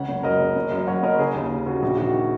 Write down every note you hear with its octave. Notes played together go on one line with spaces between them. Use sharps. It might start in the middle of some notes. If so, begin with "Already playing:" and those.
Already playing: C#2 C#3 C#5 F#5
F#1
F#2 A#4 D#5
F#1
F#1
F#2
F#2 C#5 F#5
F#1 A#4 D#5
C#3 G#4
D#2
C#3
C#3 F#4
A#1 F#4
D#3 F#4